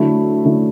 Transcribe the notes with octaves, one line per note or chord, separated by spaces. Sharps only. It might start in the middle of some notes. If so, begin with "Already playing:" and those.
Already playing: D3 F#3 A3 E4
D3 F#3 A3 E4